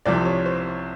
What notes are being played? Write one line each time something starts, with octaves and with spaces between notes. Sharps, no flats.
C2 C3 F3 D5
C#5
C5